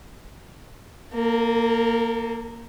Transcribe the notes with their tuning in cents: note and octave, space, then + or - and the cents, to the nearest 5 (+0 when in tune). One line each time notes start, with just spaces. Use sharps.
A#3 -5 A4 +45